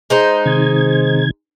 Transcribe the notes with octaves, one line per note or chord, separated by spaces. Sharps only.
G#3 D#4 C5
C3 D#3 G#6